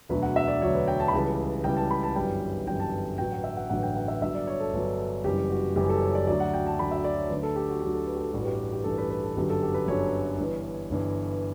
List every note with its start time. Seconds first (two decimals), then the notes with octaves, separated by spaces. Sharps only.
0.09 E1 D2 D3 F#3 B4
0.22 F#5
0.36 E5
0.48 D5
0.62 E1 D2 D3 F#3 C#5
0.75 B4
0.88 G5
1.00 A5
1.08 B5
1.13 C#2 C#3 E3 G3 A5
1.64 C#2 C#3 E3 G3 G5
1.77 A5
1.91 B5
2.03 A5
2.16 G1 F#2 E3 G3 G5
2.67 G1 F#2 E3 G3 G5
2.80 A5
3.18 A1 G2 D3 F#3 G5
3.32 F#5
3.44 E5
3.57 F#5
3.69 A1 G2 D3 F#3 F#5
3.83 G5
3.96 F#5
4.08 E5
4.21 G1 G2 F#3 E5
4.35 D5
4.47 C#5
4.60 A4
4.73 G1 G2 F#3
5.24 F#1 F#2 E3 G3 G4
5.50 F#4
5.76 F#1 F#2 E3 G3 G4
5.89 A4
6.02 C#5
6.15 D5
6.27 D2 D3 F#3 D5
6.40 F#5
6.54 G5
6.67 A5
6.79 D2 D3 F#3 B5
6.91 E5
7.04 D5
7.18 C#5
7.30 D2 D3 F#3 B4
7.43 A4
7.56 G4
7.69 F#4
7.81 D2 D3 F#3 G4
7.94 A4
8.07 B4
8.15 G4
8.21 A4
8.33 A1 G2 E3 F#4
8.45 G4
8.72 G4
8.84 A1 G2 E3 A4
8.98 B4
9.10 B4
9.23 A4
9.36 G1 F#2 D3 F#3 G4
9.49 A4
9.62 G4
9.74 B4
9.87 G1 F#2 D3 F#3 C#5
10.38 G1 G2 E3
10.90 G1 G2 E3